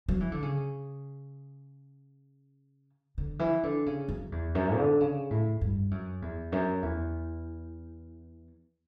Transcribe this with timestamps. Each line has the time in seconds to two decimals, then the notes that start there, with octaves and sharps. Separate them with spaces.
0.09 F#3
0.20 E3
0.32 D3
0.42 C#3
3.18 D3
3.39 E3
3.63 D3
3.86 C#3
4.08 F#2
4.32 E2
4.55 F#2
4.77 D3
5.00 C#3
5.30 A2
5.61 G2
5.91 F#2
6.22 E2
6.52 F#2
6.82 E2